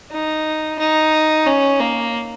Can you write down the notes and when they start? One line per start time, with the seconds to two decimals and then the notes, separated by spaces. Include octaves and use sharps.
0.11 D#4
0.79 D#4
1.46 C#4
1.80 A#3